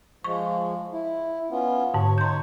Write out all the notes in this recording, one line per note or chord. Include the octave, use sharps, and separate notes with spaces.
F3 G#3 C#6
E4
B3 C#4 F4
G#2 D3 C#5
D#4 C#5 C6 G6